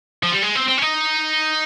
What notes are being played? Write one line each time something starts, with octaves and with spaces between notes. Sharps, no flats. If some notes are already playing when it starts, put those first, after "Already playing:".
F3
G3
G#3
C4
C4
C#4
D#4